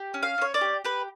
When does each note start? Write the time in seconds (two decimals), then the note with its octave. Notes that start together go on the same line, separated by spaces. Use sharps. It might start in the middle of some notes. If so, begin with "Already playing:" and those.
Already playing: G4
0.14 C#4
0.23 F5
0.38 C#4 C#5
0.54 D5
0.61 G4
0.84 G4 B4